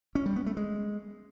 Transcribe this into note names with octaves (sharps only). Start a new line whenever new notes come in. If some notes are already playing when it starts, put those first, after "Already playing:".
C#4
G3
B3
A3
G#3